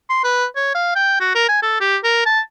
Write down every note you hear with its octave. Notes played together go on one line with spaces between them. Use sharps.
C6
B4
C#5
F5
G5
F#4
A#4
G#5
A4
G4
A#4
A5